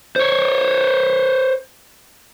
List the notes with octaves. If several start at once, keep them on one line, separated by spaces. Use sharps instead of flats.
C5 C#5